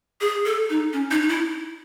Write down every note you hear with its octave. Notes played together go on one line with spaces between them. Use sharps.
G#4
A4
D#4
C#4
D#4
D#4
E4